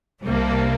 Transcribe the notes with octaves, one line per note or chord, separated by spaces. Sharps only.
C2 C3 G3 A#3 D4